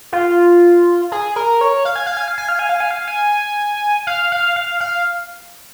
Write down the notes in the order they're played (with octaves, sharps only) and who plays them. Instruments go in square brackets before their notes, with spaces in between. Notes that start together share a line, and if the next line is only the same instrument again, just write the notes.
[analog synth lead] F4
G#4
A#4
C#5
F5
G#5
F5
G#5
F5
G#5
F5
G#5
F5
G#5
F5
G#5
F5
F5
F5
F5